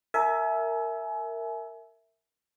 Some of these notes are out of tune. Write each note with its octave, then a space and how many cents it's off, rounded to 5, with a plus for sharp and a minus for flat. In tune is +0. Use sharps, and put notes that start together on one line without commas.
A#4 -15 E5 +0 G#5 +35